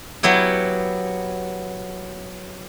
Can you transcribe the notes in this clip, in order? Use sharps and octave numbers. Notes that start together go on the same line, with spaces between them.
F#3 B3 E4 G4